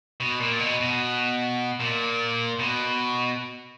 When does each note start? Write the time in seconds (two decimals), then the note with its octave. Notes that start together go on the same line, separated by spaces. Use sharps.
0.20 B2
0.40 A#2
0.60 B2
0.80 B2
1.80 A#2
2.59 B2